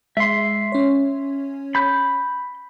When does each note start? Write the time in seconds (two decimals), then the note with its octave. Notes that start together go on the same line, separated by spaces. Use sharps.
0.17 G#3 E5 C6
0.72 C#4 C#5
1.75 B5 G6